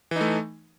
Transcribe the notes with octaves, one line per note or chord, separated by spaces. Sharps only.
E3 A3 D#4